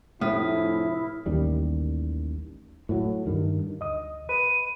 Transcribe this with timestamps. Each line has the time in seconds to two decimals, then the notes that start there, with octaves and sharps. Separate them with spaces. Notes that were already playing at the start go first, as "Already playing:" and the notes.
0.21 F1 A2 E4 D#6 F6 B6
1.26 A1 D#2 D#3 G3
2.89 A2 F#3
3.26 G2 D#3
3.80 D2 D#5 D#6
4.29 B4 D#7